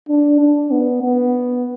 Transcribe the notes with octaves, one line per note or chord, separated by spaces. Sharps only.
D4
D4
B3
B3